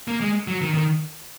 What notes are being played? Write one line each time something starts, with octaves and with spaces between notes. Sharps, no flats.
A#3
G#3
F#3
D#3
D#3